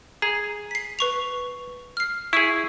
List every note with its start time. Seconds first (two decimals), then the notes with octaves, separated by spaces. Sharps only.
0.22 G#4 A#5
0.71 B6 C7
0.99 B4 C#6 F7
1.97 F6 C7
2.33 E4 G#4 C#6 E6